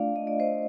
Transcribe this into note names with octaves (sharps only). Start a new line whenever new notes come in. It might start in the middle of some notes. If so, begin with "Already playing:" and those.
Already playing: A3 D4 F4 D5 F5
D#5
D5
C5 D#5